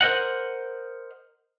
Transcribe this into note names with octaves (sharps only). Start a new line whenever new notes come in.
A#4 C5 D#5 F#5